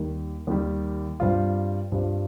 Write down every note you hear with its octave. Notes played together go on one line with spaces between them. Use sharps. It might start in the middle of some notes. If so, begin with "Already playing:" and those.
Already playing: D#2 D#3 G3
D#2 D#3 G3
G2 G3 C4 F4
G2 G3 C4 F4